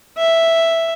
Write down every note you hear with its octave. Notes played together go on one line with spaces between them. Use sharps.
E5